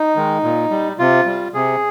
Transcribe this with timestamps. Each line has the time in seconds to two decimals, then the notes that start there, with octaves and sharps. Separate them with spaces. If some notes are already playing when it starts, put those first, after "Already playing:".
Already playing: D#4
0.16 D#3 G#3
0.43 A#2
0.71 G3
0.99 C3 F4
1.26 G3
1.54 C3 G#4